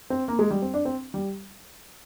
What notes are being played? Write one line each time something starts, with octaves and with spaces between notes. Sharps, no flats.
C4
A#3
G#3
G3
C4
D4
C4
G3